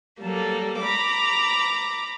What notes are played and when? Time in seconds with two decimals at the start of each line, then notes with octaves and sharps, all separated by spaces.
0.21 F#3 G3 A#3 A4
0.80 A#5 B5 D6